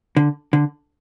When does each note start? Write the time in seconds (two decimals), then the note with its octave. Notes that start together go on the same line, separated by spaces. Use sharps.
0.16 D3
0.53 D3